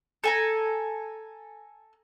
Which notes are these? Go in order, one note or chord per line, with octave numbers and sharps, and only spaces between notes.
A4 G#5 A#5